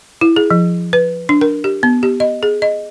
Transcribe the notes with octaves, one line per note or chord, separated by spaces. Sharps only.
E4
G#4
F3
B4
D4
A#4
G4
B3
G4
D#5
G#4
D#5